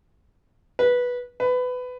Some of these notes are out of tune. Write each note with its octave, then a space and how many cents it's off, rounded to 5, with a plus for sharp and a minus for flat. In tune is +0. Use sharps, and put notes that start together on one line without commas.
B4 -10
B4 +20